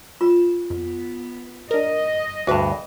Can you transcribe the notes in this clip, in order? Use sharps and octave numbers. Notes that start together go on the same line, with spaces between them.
F4 E7
F2 B3
D4 A#4 D#5
D2 G2 F#4 G#4 B4